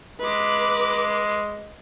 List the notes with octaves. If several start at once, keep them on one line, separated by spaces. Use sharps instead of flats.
G#3 B4 D6